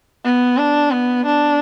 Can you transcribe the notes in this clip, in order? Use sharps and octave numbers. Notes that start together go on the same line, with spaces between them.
B3
D4
B3
D4